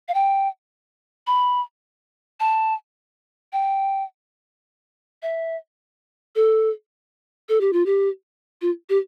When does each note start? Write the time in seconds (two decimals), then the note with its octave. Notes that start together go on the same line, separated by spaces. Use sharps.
0.08 F5
0.14 G5
1.27 B5
2.40 A5
3.53 G5
5.22 E5
6.35 A4
7.49 A4
7.61 G4
7.73 F4
7.86 G4
8.61 F4
8.89 G4